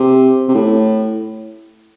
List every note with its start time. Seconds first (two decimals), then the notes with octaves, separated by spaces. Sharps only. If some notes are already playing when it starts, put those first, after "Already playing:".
Already playing: C3
0.48 C3
0.54 A2